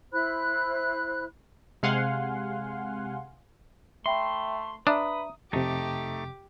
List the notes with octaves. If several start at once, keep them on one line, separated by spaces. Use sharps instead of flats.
E4 C5 B5 F#6
C3 G#3 F5 F#5 G#5 C6
A3 E5 G5 B5 C6
D4 B4 E5 A#5 D#6
F2 C3 A3 D#4 G4 D6